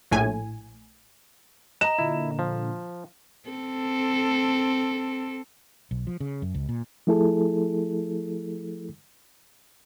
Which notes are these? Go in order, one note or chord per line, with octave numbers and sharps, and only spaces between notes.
A#1 A2 G#5
D#5 A#5 E7
A#2 D3 E4
F3
C4 A4
B1
F3
C#3
F#2
C#2
A#2
F3 A3 E4 G#4 A4